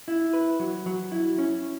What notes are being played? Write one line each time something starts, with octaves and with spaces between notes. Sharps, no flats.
E4
B4
F#3
F#3
E4
C#4